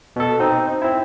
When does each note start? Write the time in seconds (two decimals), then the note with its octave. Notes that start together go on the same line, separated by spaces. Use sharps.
0.16 B2 A4
0.40 C4 D#4
0.82 C4 E4